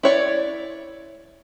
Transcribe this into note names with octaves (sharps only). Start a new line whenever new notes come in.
E4 C#5 D5